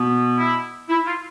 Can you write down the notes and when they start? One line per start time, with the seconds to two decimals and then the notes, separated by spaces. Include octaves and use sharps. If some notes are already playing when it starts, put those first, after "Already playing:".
Already playing: B2 B3
0.37 E4
0.89 E4
1.06 F4